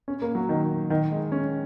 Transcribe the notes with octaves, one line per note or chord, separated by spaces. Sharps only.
C#4
A#3
F#3
D#3
D#3
G#3
C#4